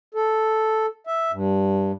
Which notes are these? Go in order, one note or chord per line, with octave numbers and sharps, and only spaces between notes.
A4
E5
G2